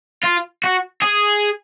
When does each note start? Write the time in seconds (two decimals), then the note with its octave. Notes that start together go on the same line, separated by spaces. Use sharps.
0.23 F4
0.64 F#4
1.02 G#4